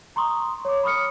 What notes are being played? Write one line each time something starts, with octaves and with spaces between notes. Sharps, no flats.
A#5 C6 C#6 D#6
C#5 D6
B5 C#6 D#6 F6 C#7